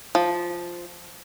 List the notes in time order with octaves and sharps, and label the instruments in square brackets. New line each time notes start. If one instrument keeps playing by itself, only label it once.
[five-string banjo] F3